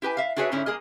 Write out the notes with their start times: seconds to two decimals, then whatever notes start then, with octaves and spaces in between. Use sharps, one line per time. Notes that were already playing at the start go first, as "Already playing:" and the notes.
0.02 E4 G4 B4 G#5
0.17 E5 F5
0.36 D4 F#4 G#4 B4 C#5 E5
0.52 G#2 D3 C#4 E4
0.66 G#3 A#3 G#4 D#5